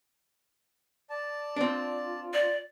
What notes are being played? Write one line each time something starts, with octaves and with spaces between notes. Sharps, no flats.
D5 A5
C4 D4 F4
D5